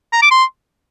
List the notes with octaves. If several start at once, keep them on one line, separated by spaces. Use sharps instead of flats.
A#5
D6
C6